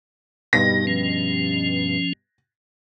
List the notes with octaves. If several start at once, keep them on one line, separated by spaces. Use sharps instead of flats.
G2 B2 D#4 A#6
F3 C#4